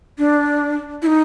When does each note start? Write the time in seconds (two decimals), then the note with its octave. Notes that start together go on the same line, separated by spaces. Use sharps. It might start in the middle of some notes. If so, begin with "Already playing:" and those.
0.18 D4
1.02 E4
1.06 D#4